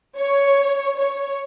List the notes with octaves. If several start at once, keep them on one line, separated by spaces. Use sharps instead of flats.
C#5
C#5